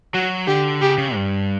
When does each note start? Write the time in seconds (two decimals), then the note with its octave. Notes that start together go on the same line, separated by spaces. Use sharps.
0.14 F#3 F#4
0.47 D3 G4
0.81 C#3 G4
0.98 C#3
1.15 G2